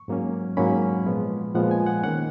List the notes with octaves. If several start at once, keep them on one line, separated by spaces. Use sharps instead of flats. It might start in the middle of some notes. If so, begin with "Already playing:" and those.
Already playing: C#6
G#2 F#3 A#3 C#4
G#2 F#3 A#3 C#4 B5
A#2 F3 G#3 B3
A#2 F3 G#3 B3 F#5
G#5
F#5
D#3 A#3 C#4 F#5